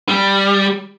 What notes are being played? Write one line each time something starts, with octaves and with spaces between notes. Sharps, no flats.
G3